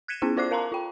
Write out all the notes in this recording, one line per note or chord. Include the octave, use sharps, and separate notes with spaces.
F#6 G#6 B6 C#7 D#7 E7
B3 C#4 E4 G#4
F4 C5 D5 D6 F#6 C7
A#4 F5 A5 A#5 C6
F4 G5